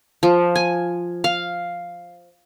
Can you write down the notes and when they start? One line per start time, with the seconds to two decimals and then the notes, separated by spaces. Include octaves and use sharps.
0.23 F3
0.55 G#5
1.24 F5